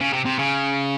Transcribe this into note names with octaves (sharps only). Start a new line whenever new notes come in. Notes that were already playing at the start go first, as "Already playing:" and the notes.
C#3
C3
C3
C#3